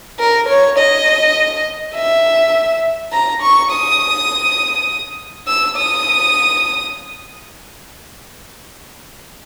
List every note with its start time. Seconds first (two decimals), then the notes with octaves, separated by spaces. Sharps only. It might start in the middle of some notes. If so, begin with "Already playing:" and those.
0.19 A#4
0.49 C#5
0.78 D#5
1.95 E5
3.13 A#5
3.42 C#6
3.71 D#6
5.48 E6
5.77 D#6